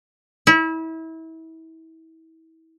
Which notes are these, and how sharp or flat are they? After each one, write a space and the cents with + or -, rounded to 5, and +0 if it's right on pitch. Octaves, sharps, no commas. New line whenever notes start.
E4 -30